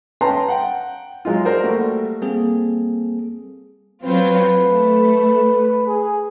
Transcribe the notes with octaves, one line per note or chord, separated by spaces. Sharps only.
C#4 B4 G5 A5 A#5 C6
F#5 G5
F#3 G#3 D#4 F4
A#4 C5 D5
G3 A3 A#3 F#4
G3 A#3 C4 G#4 A4
F#3 C4 F4 B4
A3
G#4